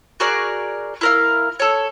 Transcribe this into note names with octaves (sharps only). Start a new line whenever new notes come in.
F#4 G#4 A#4 D5
E4 A#4 F5
A4 C#5